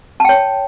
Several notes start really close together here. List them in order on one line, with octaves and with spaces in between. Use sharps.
A5 G5 C#5